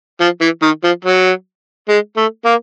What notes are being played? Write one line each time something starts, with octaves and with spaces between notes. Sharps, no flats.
F3
E3
D#3
F3
F#3
G#3
A3
A#3